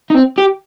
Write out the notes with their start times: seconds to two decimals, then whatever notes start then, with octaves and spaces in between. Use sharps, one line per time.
0.10 D#4
0.15 C4
0.38 G4